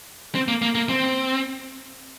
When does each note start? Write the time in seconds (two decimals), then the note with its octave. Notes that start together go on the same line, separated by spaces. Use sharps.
0.35 C4
0.48 A#3
0.62 A#3
0.75 A#3
0.89 C4